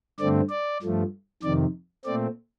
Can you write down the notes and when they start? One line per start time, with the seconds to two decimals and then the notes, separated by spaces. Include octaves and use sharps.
0.19 G2 D3 A3 C4 D5
0.50 D5
0.82 G2 F3 A3
1.43 F2 C3 D#3 D5
2.05 A#2 A3 C4 D5